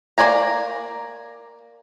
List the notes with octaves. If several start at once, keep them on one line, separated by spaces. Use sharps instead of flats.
A#3 C5 D5 G#5 A#5